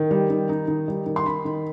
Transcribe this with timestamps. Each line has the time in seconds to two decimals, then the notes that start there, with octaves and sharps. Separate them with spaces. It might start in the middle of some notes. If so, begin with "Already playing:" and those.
Already playing: D#3
0.11 G3
0.30 D#3
0.49 D#4
0.68 D#3
0.88 G3
1.06 D#3
1.16 C6
1.26 D#4 B5
1.45 D#3